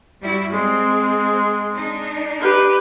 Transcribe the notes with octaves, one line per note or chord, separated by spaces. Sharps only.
G3 E4 F#4
G#3 C4
D4 D#4
G4 B4